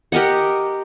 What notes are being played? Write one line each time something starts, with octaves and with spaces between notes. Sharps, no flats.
G4 A#4 D#5 F#5